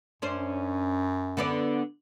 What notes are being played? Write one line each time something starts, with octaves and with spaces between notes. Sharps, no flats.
F#2 C#4 D4 C5
D3 B3 D5